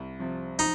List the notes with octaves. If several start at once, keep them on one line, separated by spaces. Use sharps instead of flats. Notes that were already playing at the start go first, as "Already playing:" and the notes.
Already playing: C2
C3 F3
F3 D#4